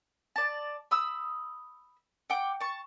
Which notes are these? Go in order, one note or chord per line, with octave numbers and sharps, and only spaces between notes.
D5 A5
B5 D#6 E6
F#5 G5 D6
A5 C#6